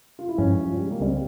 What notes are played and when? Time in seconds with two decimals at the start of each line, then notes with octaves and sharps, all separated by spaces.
0.19 F4
0.29 E4
0.38 G2 F3 G#3 C#4
0.65 F3
0.74 G3
0.83 G#3
0.91 A#3
1.00 C#2 C#3 G3 C4